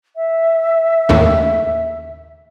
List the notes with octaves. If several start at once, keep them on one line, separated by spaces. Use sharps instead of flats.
E5
D#2 A2 C#3